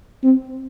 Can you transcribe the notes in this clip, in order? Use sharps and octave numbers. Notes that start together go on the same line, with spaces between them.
C4